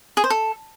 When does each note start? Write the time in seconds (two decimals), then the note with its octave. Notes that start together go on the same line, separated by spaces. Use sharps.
0.17 G#4
0.24 C5
0.30 A4